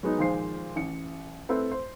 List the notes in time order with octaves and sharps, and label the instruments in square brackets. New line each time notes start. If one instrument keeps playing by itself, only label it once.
[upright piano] F#3 G#3 B3 D#4
A#2 D#3 F3 G#3 C5 C7
A1 C#7
A3 C4 E4 A4 B4
C5